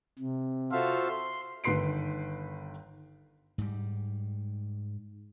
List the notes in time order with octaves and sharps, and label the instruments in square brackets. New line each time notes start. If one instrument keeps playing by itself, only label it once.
[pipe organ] C3
F4 F#4 A4 C5 E5 F5
C6
[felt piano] G1 D#3 B4 C6 C7 D7
[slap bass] G#2 G3